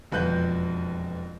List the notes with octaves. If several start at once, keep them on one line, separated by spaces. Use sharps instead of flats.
E1 F2 B4 F#6 G6